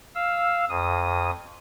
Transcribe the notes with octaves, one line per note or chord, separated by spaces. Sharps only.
F5 E6
F2 D#6